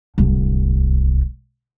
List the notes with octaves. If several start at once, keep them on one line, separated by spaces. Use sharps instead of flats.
D1 C2